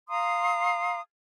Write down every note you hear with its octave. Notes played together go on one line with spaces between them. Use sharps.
F5 A#5 C6 D#6